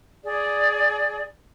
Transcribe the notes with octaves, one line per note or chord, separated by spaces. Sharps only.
G#4 D5